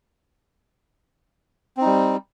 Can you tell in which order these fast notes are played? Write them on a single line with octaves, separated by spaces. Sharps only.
C4 D#4 G3